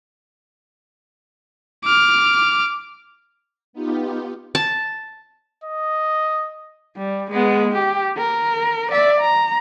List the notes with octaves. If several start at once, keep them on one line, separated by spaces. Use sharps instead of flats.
D6 F6
B3 D#4 F4 G4
A5
D#5
G3
G#3 B3
G4
A#4
D5 E5
A#5